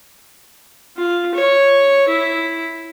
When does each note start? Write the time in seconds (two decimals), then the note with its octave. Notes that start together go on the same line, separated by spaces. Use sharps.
0.97 F4
1.34 C#5
2.08 E4